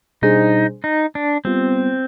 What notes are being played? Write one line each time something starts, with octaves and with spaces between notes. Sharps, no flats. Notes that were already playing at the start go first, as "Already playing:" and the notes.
B2 G3 D4 D#4 G#4 C5
D#4
D4
G3 B3 C4 F4